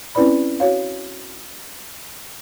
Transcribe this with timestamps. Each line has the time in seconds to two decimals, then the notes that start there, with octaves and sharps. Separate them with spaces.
0.15 C4 C#4 E4 B4 D5 B5
0.60 F#4 C#5 F5